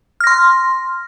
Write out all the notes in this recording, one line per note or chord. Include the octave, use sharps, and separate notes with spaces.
C6 F6 A#6